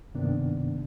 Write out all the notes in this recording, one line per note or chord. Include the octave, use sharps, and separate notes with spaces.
G2 C3 D#3 A#3 B3 D4